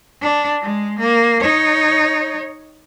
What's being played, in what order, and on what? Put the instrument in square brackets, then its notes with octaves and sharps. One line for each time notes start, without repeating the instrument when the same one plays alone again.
[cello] D4
G#3
A#3
D#4 C#5